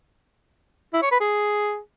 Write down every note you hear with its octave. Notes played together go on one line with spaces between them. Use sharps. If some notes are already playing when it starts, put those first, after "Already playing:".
E4
C#5
B4
G#4